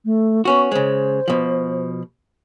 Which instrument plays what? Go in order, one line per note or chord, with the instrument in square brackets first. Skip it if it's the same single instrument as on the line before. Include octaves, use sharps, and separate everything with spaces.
[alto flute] A3
[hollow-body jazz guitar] B3 C#4 F#4 [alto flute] C#6
[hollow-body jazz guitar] C#3 G#3 [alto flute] C5
[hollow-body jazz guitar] B2 F3